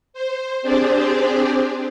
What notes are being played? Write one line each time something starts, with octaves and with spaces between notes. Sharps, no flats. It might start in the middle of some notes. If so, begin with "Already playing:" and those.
C5
C4 D4 G4 G#4 C5 D5